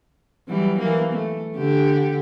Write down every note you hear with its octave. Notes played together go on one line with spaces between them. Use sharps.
E3 F#3 G3
E3 A#3
A3
D3 G4